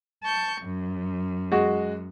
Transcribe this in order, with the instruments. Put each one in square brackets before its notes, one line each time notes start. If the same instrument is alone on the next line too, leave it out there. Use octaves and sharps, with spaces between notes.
[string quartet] A5 C#6 G6
F#2
[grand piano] G#3 F#4